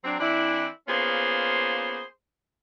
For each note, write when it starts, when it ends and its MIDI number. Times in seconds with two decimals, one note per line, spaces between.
0.04 0.16 54
0.04 0.16 60
0.04 0.16 62
0.20 0.66 52
0.20 0.66 60
0.20 0.66 62
0.20 0.66 64
0.88 2.01 58
0.88 2.01 59
0.88 2.01 61
0.88 2.01 65
0.88 2.01 68
0.88 2.01 72